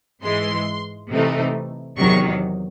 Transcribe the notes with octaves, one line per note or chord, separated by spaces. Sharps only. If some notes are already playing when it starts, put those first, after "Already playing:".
G#2 E3 G#3 C6
C3 E3 A3 D#4
E2 C3 D#3 F#3 C#6